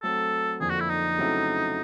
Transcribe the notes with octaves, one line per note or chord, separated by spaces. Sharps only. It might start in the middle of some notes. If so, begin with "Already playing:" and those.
F#3 A3 C4 A4
F2 D3 F3 A#3 G#4
F#4
E4
D#4
C#3 F#3 A3 C4 E4